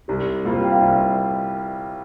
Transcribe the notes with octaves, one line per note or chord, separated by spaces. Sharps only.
C2 G4
C3 G3 A#3 F4
G5
F5
C2 E5